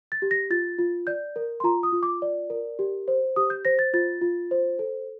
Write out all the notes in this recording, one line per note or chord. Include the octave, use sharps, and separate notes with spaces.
A6
G4
A#6
F4 A6
F4
D5 G6
A#4
C6
F4 A#5
D#6
F4
D6
D5
A#4
G4
C5
G4 D#6
G6
C5 A#6
A6
F4 A6
F4
C5
A4